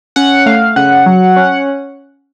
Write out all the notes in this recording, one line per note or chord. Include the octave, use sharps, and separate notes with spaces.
C#4 F#5
A3 F5
C#3 F#5
F#3
C#4